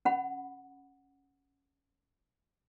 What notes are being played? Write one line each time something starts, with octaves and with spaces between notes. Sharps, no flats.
C#4 F#5 B5